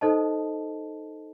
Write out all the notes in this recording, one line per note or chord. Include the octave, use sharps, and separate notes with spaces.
D#4 A4 C5 D#5 A5